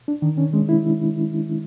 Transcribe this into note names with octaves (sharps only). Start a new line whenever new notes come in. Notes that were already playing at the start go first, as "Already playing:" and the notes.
D4
D#3
C#4
G#3
E4